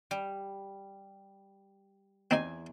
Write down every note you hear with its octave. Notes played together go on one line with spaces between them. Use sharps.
G3
E2 C4 D#4 G#5